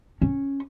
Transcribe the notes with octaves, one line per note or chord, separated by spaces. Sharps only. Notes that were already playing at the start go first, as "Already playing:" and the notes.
C#4